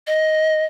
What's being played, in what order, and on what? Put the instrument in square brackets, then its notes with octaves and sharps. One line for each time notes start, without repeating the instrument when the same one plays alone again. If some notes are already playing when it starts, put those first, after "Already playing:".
[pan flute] D#5